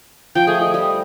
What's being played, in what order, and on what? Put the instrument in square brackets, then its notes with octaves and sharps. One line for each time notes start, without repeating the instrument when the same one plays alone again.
[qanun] F3 [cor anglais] G5
[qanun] A3 [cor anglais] G#4
[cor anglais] D#5
[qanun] G3 [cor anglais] D#5